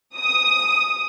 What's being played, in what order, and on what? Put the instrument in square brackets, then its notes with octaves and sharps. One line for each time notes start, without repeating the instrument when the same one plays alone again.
[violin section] D#6